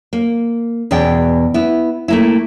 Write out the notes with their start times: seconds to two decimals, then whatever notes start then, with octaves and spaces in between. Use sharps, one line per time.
0.13 A#3
0.91 E2 B2 G#4 D5 G5
1.54 B3 E4
2.08 A3 A#3 E4